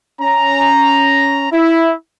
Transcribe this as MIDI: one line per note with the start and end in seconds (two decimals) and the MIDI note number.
0.21 1.47 61
0.21 1.47 82
1.52 1.93 64